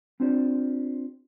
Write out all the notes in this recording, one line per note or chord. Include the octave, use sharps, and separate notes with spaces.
C4 D4 F4 G4 C5 D5